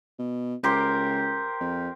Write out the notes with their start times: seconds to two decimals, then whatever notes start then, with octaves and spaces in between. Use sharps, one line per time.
0.19 B2
0.64 C#2 G4 A#4 C5
1.60 F2